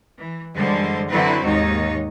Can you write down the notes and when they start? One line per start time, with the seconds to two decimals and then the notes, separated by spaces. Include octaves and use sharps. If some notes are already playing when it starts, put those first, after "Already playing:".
0.17 E3
0.56 F#2 D3 E3 G3 G#3 C5
1.09 D3 F#3 C4 E4 F#4 B4
1.45 D#2 G#2 D#4 C#5